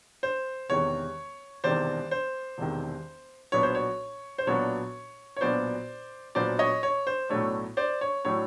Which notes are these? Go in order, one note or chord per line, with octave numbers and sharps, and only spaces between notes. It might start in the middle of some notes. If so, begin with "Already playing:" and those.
C5
E1 E2 C3 D#3 C#5
E1 E2 C3 D#3 C5 D5
C5
E1 E2 C3 D#3
B1 A#2 F#3 B3 D4 C#5
C5
C#5
C5
B1 A#2 F#3 B3 D4 C#5
C#5
B1 A#2 F#3 B3 D4 C5 D5
B1 A#2 F#3 B3 D4 C5 D5
C#5 D#5
C#5
C5
B1 A2 F#3 A3 D4 C#5
C5 D5
C#5
A2 F#3 A3 D4 C#5